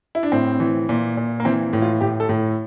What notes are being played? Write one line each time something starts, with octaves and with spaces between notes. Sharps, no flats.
E4
D4
A2 C4
E3
A#2
A#2
A#3
E3 C4
A2
F4
A2 G4
A4
A2